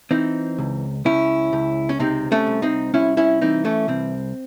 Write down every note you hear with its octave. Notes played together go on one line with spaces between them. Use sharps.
E3 C4 D#4
C#2
C#2 C#4 E4
C#2
C#4
C3 C4 D#4
A3 C#4
C2
C4 D#4
C2 C#4 E4
C#4 E4
E3 C4 D#4
A3 C#4
C2 C4